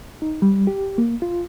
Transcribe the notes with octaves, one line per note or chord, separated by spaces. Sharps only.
D#4
G3
G4
A#3
F4